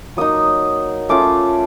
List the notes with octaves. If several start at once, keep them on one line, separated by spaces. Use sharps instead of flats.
F#3 A#3 D#4 D#6
A3 C#4 F4 D6